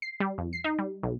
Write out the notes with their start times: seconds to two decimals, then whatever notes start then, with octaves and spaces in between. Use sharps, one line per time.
0.02 C7
0.20 G3
0.38 F2
0.53 C7
0.64 D#4
0.79 G3
1.03 B1